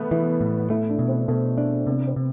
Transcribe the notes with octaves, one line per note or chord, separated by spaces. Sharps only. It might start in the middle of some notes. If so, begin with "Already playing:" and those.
Already playing: A3 B3
E3 E4
A2
A3 E4
D4
B2
C4
B2 A3
D4
C3 B3
C4
C3